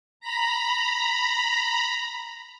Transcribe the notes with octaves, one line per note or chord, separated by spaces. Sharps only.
A#5 B5